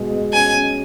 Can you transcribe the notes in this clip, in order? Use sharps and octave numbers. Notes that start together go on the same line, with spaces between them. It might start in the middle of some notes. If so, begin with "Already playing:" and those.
Already playing: B2 G#3
G#3
C#4 G#5
C#4